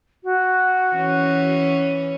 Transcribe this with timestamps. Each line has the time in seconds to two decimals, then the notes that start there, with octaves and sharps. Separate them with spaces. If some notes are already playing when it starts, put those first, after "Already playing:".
0.24 F#4
0.94 E3 C#4